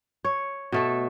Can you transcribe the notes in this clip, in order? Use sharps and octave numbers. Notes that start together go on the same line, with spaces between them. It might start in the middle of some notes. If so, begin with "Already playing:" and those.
C#5
B2 A3 A4